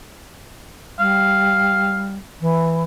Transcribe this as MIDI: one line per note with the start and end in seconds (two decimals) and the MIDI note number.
0.99 2.16 55
0.99 2.13 77
2.41 2.84 52